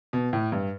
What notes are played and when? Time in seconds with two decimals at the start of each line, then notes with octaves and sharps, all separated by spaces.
0.13 B2
0.33 A2
0.52 G2